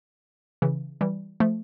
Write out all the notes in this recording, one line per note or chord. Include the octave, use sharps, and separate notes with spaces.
C#3 E3
E3 G3
F3 A3